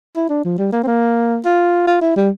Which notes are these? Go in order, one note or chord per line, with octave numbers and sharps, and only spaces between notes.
E4
D4
F3
G3
A#3
C4
A#3
F4
F4
E4
G3